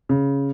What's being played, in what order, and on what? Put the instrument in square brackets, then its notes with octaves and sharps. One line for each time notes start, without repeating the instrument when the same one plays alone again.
[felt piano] C#3